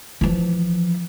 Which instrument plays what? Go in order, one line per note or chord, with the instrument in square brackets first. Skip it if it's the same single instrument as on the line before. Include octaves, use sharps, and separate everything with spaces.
[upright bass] E3 F3